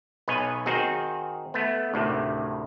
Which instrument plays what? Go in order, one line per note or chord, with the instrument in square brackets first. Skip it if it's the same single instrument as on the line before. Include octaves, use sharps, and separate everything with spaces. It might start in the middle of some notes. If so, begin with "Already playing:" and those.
[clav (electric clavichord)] B1 B4 C#5 D#5 G#5
D#3 C4 D#4 F#4 G#4
A3 B3
D2 A2 C3 D#3